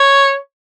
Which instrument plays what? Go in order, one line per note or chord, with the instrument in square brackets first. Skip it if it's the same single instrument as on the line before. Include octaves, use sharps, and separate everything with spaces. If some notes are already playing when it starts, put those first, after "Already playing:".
Already playing: [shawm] C#5